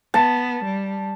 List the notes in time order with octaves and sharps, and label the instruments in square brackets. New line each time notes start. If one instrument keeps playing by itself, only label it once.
[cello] B3 [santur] A5
[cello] G3